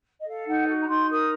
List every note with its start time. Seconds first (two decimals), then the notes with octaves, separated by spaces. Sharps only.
0.18 D#5
0.25 A4 F5
0.46 D#4 F#5
0.67 F#4
0.81 A#5
0.88 D#4 C6
1.09 A#4 D#6